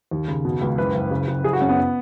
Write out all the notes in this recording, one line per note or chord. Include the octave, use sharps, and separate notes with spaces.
D#2
C#3
B2
C#2
F#1 B4
F#1
C#3
C#3
F#1 G#4
F#4
F#2 C#4
B3